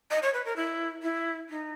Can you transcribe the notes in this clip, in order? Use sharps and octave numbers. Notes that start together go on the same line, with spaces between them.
D#5
C#5
B4
A#4
E4
E4
D#4